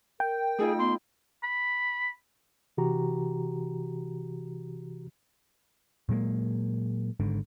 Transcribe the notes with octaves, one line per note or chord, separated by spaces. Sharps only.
A#4 G5
A3 D#4 F4 G#4
B3 C6
B5
C3 E3 F#4 G4 A#5
A#2 F#3 G#3 A#3
G#1 G#2 D3